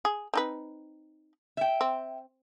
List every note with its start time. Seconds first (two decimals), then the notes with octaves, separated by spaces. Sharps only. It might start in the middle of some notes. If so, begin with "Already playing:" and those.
0.05 G#4
0.34 C4 D#4 B4
1.57 E5 G5
1.81 C4